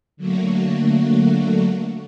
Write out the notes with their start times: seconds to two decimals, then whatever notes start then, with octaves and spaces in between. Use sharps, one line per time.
0.17 D3 F#3 A3 A#3 F#4